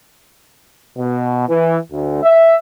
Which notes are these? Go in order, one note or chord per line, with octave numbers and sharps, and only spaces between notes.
B2
E3
D2
E5